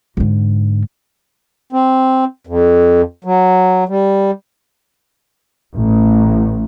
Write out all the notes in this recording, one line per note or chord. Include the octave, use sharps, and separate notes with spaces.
G#2 D3
C4
F2
F#3
G3
A1